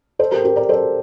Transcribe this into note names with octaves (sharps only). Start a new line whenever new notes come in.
A4 C5
G4 A#4
G4 A#4
A#4 D5
A4 C5